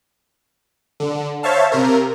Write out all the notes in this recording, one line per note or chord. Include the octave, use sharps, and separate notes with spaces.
D3
C5 C#5 E5 F5 A5
C3 A#4